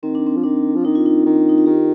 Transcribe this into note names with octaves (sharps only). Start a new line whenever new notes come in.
D#3 C4
D4
C4
F3
D#3 D4
F3
D#3 D#4
F4
D#4
D#3
D#4
F4
D#3 G4